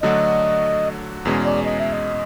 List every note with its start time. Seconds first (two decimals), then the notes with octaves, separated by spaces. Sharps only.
0.02 D3 F#3 A3 D4 F#4 D#5
1.25 E2 B2 G#3 C#4
1.46 D5
1.66 D#5
1.79 E5
1.92 D#5